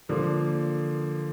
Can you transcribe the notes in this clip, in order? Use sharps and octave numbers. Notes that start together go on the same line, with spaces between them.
D3 F3 A#3